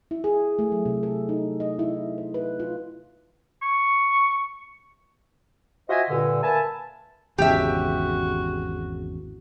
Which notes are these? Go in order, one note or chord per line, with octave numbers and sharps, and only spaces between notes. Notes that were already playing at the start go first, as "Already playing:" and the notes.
E4
G#4
A3
F#3
C3
A4
D#4
D#5
E4
C5
B4
F4
C#6
F4 F#4 C5 D#5 E5 G#5
G2 A#2 D3
A#3 B4 E5 G#5 A5
G#1 E2 C#3 F#4 G4 E5